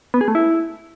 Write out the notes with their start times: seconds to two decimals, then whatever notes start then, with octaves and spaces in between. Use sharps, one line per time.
0.14 B3
0.21 G#4
0.28 A3
0.35 E4